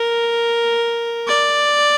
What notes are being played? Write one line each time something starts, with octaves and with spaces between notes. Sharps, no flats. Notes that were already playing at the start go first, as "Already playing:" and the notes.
Already playing: A#4
D5